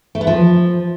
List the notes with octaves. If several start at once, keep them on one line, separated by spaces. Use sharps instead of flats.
A3
B3
F3